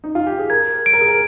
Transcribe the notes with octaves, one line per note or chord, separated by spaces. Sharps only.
D#4
F4
G4
G#4
A#4 G#6
D7
A#4
G#4
A#4